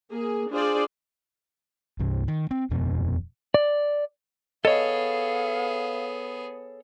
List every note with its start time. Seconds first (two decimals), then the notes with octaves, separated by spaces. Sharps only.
0.11 A#3 G#4
0.51 D4 F4 G#4 C5 D5
1.99 C2 G2 C3
2.28 D#3
2.51 C4
2.70 D#1 F2 B2
3.54 D5
4.65 B3 G#4 A4 C#5 D#5 F5